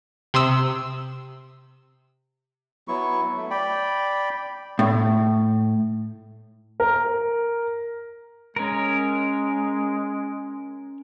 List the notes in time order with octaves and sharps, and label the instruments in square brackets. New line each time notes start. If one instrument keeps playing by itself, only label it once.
[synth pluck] C3 C6 D#6 E6
[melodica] F#3 B3 E4 C#6
A3
D5 G5 B5
[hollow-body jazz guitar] A2
[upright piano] A#4
[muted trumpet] G#3 [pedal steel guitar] C#4 A#4